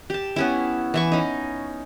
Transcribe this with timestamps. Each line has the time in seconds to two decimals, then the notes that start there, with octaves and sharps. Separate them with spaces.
0.10 G4 A5
0.36 B3 C#4 E4
0.94 E3 E4 C#6
1.12 C#4 D#4